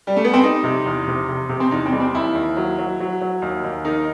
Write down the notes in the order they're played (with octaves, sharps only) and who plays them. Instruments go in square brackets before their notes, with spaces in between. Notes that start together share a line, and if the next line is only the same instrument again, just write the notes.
[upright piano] G3
A3
B3
C4
[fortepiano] G3 [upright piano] D#4
[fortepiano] C3
E2
C3
C3
C3
[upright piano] C4
[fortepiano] E2 [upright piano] D#4
[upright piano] C4
[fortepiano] G3
[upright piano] C4
[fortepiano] D#2 [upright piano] E4
[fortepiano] D#2
F#3
F#3
F#3
F#3
D#2
D#2
[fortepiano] D#3 [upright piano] D#4